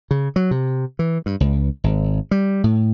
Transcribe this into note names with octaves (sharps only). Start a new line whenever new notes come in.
C#3
F#3
C3
E3
G2
C#2
G#1
G3
A2